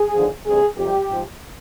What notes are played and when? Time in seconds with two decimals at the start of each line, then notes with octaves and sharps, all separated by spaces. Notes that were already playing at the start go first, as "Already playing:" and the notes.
Already playing: G#4
0.14 D#2 D3 F3
0.46 D2 C3 G3 G#4
0.77 F2 C3 G3 G4
1.10 G#2 F3